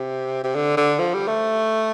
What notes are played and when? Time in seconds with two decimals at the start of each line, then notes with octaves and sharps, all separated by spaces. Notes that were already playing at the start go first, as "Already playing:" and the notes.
Already playing: C3
0.44 C3
0.55 D3
0.77 D3
0.99 F3
1.14 G3
1.28 A3